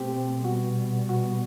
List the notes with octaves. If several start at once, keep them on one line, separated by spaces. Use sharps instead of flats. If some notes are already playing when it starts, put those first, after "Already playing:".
Already playing: B2 A3 C4 G4
B2 G3 B3 F#4
F#4